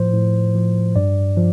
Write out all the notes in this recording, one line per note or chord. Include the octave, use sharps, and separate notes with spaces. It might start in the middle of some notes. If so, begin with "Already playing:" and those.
Already playing: A2 F3 C5
A2
F3
G2 D5
F3